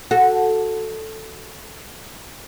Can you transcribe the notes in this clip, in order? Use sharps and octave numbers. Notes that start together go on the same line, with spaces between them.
F#4 A4